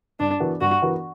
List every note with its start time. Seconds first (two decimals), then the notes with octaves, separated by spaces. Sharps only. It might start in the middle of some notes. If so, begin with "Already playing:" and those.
0.20 G2 D4
0.40 E3 B3 F#4 A#4
0.61 G2 F#4
0.82 E3 B3 F#4 A#4